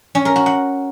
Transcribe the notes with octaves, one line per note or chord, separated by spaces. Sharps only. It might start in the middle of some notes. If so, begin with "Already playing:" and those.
C#4
A#4
F#4
F#5